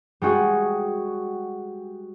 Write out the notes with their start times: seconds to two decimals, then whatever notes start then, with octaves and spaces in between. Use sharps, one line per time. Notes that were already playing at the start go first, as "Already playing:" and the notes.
0.22 G3 G#3 F#4 G#4